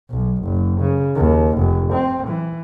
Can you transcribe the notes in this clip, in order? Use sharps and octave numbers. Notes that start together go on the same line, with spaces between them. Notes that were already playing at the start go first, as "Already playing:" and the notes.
B1
F#1
C#3
D#2
F1
C4
E3